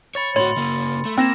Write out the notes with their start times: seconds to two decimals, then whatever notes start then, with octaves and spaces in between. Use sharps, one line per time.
0.15 C#5 B5 A6 C#7
0.36 A2 F#4 C#5 B5 C6
0.57 C#3 A#3
1.05 A3
1.18 A#3 C4 G5 E6 A#6 E7